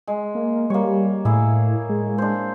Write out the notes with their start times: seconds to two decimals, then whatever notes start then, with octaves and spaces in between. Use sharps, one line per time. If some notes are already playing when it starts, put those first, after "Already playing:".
0.08 G#3
0.35 A#3
0.70 G3 A#3 C#5
1.25 A2 E4 G#4 E5
1.90 G#3
2.18 D4 C5